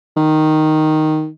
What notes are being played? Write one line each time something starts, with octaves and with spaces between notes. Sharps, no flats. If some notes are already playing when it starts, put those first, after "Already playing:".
D#3